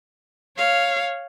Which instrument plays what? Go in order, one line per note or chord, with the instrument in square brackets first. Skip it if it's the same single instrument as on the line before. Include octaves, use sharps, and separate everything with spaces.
[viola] C#5 F5